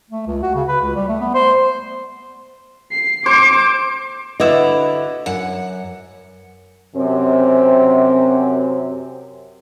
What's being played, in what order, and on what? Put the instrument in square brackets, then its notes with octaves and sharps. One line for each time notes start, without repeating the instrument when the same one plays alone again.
[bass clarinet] A3
C#2
F#4
C#3
B4
C#2
G3
A3
B3
C5
[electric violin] C7
[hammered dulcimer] C5 [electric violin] D6
[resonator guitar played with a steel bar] D3 E4 [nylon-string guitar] F#4 B4 D#5
[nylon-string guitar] F#2 [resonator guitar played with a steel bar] F#5
[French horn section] F#2 C3 C4